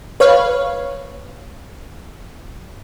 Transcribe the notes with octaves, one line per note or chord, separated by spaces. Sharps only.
B4 C#5 F5